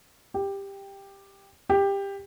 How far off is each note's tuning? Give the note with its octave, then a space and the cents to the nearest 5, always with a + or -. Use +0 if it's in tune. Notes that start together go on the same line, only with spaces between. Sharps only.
G4 +10
G4 +15